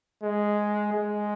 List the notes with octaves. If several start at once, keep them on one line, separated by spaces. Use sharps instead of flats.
G#3
G#3